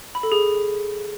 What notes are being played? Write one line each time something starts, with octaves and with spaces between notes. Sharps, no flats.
B5
A4
G#4